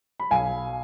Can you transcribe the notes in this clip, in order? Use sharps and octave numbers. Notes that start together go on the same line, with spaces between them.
B5
B1 F5 G#5